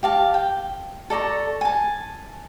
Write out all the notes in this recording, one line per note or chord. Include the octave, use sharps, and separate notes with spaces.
G4 F5 A5
G5
A4 D5 A#5 C#6
G#5 A5